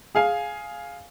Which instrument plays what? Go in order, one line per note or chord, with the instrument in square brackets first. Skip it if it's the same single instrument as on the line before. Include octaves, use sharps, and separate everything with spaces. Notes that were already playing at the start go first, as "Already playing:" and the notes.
[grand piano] G#4 F5 G#5